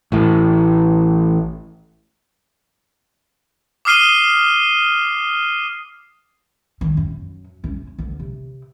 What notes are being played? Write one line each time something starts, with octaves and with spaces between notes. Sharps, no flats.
A1 A2
D6 D#6 F6 C7 D#7 G7
D#3
F#2
C#4
D2
C3